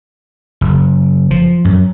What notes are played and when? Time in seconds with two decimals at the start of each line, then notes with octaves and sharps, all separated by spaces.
0.61 F#1
1.31 F3
1.65 F#2